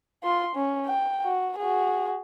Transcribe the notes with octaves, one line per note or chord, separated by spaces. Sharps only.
F4 C6
C#4
G5
F#4
F#4 G#4